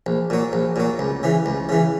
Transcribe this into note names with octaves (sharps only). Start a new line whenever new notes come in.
A#1
A#2 F#3
A#1
A#2 F#3
C#2
C#3 E3
C#2
C#3 E3